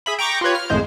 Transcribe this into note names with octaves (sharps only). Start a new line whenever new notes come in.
G#4 E5 B5
G5 A#5 C#6 D6 A#6
F4 G4 B4 C#5
F6
G#1 F2 A2 G#3 C5